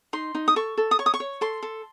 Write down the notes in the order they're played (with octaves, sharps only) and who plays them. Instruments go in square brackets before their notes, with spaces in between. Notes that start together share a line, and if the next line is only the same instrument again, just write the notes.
[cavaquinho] D#4 C6
D#4
D#6
A4 C#6
A4
D#6
C#5 C#6
D#6
C#6
C#5
A4 C6
A4